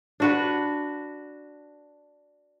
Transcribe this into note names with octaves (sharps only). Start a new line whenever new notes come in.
D4 F#4 B4